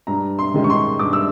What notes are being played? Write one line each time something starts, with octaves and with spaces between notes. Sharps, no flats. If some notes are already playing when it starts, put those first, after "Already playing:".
G2 A#5
C6
D#3 G#3 C#4
C#6
C6
G2 D6
E6